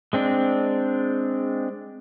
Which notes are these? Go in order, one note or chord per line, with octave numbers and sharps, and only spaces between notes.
G#3 C4 D4